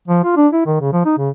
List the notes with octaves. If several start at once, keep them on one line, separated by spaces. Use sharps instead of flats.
F3
F4
D4
E4
D#3
C#3
F3
D#4
C#3